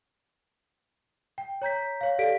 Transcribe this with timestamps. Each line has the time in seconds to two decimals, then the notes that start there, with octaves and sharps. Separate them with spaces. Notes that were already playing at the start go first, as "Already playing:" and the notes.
1.38 G5
1.62 C#5 A#5 G6 B6
2.01 C#5 F5
2.18 G4 A4 D5 F5 B6 D7